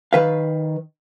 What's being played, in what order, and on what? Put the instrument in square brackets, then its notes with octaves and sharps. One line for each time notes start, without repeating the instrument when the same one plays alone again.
[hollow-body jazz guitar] D#3 B4 F5